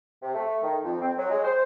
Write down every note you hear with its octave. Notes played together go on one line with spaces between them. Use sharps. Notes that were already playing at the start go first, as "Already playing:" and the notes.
C3
A3
D#3
F2
C4
F#3
G#3
C5